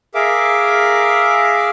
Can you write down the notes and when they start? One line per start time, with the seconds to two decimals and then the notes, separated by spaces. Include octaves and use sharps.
0.15 G#4 A#4 E5 F5 D6